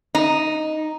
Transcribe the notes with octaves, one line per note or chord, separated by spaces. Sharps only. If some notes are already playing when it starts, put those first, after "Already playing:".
D#4